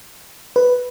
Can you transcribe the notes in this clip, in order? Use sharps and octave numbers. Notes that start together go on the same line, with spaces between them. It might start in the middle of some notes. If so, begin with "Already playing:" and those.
B4